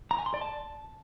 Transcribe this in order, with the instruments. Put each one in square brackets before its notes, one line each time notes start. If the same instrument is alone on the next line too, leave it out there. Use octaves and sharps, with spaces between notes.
[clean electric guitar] A#5
G#5
C6
D5
A5